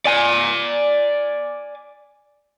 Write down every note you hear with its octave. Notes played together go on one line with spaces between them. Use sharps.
D5 G#5